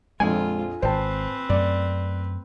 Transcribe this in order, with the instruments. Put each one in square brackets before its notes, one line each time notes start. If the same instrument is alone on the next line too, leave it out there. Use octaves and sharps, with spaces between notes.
[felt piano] A#1 F2 [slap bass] G#3 [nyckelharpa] F4 [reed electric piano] G#5
[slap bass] G#1 [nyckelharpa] C4 B4 [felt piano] C5 G5 A5
[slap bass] F#2 A3 [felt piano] D5